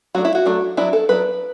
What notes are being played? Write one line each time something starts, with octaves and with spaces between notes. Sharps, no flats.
F#3 A3 D4 F#4
E4
F#4
F#3 A3 D4
F#3 B3 D4 E4
A4
F#3 B3 D4 B4